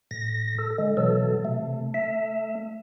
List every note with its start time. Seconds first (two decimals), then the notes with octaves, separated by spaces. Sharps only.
0.11 A2 A#6
0.59 A4
0.78 D3 G#3
0.97 B2 E3 F#3 A4
1.45 C3 A3
1.94 A3 E5